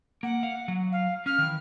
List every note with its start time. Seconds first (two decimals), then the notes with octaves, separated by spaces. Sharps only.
0.23 A#3 F#5
0.43 F5
0.68 F#3
0.92 F5
1.26 C#4 F6
1.38 D#3 E3